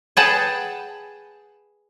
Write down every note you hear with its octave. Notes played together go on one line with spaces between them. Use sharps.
G#4 B4 F#5 G5 A5